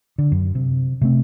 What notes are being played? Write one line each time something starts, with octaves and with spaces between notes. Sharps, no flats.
D3
F#2
C3
C3 A3 C4